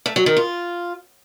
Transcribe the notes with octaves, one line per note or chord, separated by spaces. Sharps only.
A3
F#3
D#3
F4